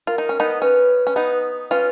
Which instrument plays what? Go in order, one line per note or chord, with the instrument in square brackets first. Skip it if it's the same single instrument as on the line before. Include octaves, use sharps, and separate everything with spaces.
[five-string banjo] F4 [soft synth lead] A#4
[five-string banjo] D#4
C#4
B3 D#4
[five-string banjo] C#4 [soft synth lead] B4
[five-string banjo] C#4
B3 D#4
[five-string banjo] C#4 F4 [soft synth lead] B4